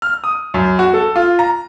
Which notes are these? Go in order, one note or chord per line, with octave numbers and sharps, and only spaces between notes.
F6
D#6
F#2
F#4
A4
F4
A#5